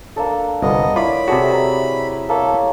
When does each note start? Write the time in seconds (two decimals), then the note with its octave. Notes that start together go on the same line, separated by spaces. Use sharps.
0.16 A#3 D4 A4
0.62 G1 C2 B3 D#5
0.96 E4 F4 C#5 D5 B5
1.28 C3 G3 F#4 G#4 A4
1.49 B4 E5 A#5
2.29 A#3 A4 C#5 E5